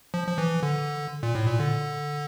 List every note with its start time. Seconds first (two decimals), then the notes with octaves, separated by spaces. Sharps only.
0.14 F3
0.28 F3
0.38 E3
0.63 D3
1.23 A#2
1.35 A2
1.47 A#2
1.60 D3